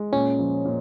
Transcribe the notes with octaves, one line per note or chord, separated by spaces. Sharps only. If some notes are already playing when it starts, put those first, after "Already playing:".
Already playing: G#3
A#2 C#4
F3
A#2